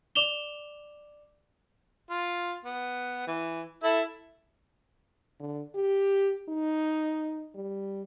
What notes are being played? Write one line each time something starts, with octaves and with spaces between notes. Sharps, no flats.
D5 D6 E7 F7 G7
F4
B3
E3
E4 A4 E5
D3
G4
D#4
G3